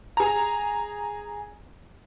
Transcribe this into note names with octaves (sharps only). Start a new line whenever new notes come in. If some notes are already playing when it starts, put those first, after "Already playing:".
G#4 A#5